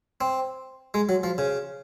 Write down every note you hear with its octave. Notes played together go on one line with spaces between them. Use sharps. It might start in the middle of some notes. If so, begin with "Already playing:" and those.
C4
G#3
F#3
F3
C#3